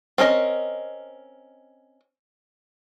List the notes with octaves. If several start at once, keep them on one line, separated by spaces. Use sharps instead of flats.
C4 C#4 A#4 D#5